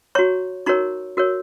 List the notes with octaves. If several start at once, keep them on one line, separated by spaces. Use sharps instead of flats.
F#4 C#5 A#5 C#6
D#4 F#4 A#4 C#5 A#5 C#6
F#4 A#4 C#5